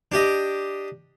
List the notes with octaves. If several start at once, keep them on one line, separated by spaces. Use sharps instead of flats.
D4 G4 D#5